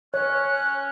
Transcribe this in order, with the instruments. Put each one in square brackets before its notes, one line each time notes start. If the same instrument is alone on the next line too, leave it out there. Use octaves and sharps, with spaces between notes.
[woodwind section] C#4 [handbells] C#5 [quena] F#6